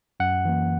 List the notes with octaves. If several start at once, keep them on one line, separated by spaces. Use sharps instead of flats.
F#2 F#5
E3 A#3